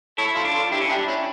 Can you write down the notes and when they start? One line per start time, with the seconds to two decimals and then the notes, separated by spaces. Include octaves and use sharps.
0.18 E4 A4 C#5
0.36 F4 A4
0.45 D4
0.54 F4 A4
0.72 D4 E4 G4
0.81 C#4
0.89 D4 E4 G4
1.08 C#4 E4